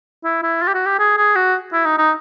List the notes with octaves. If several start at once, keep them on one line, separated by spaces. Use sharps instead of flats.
E4
E4
F4
G4
F#4
G4
G#4
G#4
F#4
E4
D#4
D#4